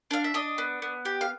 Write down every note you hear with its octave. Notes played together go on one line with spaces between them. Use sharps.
D4 F5
E5
D4 D#5
B3
B3
G4
F5